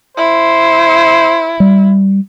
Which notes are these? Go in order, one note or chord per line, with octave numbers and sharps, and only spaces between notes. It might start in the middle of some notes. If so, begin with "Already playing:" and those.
E4 C5
G3